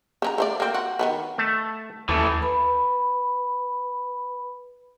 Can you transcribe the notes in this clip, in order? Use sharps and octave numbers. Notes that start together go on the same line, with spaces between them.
C#3 D#4 A#5
A3 C5 D5
A#3 C4
F#4
D#3 G#3 B3
A3 A5
D#2 E3 A3 A5
B4 B5